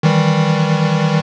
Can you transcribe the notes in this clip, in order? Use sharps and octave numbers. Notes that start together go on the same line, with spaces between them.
D#3 E3 G3